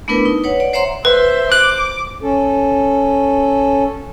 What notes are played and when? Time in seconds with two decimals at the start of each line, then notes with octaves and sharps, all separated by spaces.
0.08 A3 B3 D4 E4 A#4 B4
0.25 D#4
0.44 B4 C#5 F#5
0.60 D5 F#5
0.73 C5 C#5 E5 F#5 A#5 C6
1.05 B4 C5 E5
1.52 D6 F#6
2.23 C#4 A4